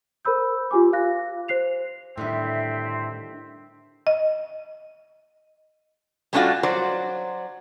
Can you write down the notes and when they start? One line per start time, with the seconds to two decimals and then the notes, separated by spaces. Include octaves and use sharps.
0.25 A#4 C5 B5 E6 G6
0.71 F4 G4 G#5 D6
0.93 F5 F#6 A#6
1.48 C5 F#6 C7 F7
2.18 A2 D3 D#3 G3 C4 E5
4.07 D#5
6.33 G3 A3 C#4 D4 F4 F#4
6.63 F#3 C5 D5